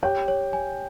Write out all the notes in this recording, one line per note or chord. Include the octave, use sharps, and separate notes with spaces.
G4 C#5 G5
C#5
G#5